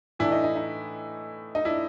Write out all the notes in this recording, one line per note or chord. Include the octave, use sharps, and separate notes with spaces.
A2 E3 A3 D4 E4
D#4
D#4
D#4
D#4
D4 E4